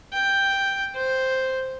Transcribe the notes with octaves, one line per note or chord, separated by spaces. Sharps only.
G5
C5